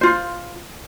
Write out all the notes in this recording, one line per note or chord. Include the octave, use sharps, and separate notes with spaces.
F4 C5